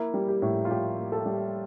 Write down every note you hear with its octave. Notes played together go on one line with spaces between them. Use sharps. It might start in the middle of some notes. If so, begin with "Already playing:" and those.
Already playing: A#3 E4
G3
G4
A2
F4
A2 G4
A#3
A4
G3